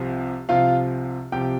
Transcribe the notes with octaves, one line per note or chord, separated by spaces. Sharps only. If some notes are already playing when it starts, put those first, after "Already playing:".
Already playing: C2 C3 F3
C2 C3 F3 F4 F5
C2 C3 F3 G4 G5